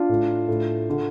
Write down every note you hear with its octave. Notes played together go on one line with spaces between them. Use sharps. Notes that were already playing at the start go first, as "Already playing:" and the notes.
Already playing: D4 F4
A2
A2
D3